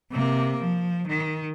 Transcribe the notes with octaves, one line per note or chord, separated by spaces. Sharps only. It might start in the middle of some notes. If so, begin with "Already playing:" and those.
C3 A#3
F3
D#3